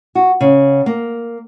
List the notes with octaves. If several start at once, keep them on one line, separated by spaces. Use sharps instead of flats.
F#4
C#3
A#3